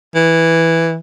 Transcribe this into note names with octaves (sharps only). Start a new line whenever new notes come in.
E3